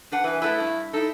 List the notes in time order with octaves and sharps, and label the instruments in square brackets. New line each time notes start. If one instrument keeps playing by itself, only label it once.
[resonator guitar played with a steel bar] D4 B4 F#5
[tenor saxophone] E3 [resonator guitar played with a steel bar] B4 G#5
[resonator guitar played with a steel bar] A3 A4 B4 [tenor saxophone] E4
[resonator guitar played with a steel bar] G2
[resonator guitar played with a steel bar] D#4 E4 [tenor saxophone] A4